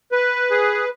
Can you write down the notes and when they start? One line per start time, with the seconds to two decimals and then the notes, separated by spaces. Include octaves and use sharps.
0.12 B4
0.51 G#4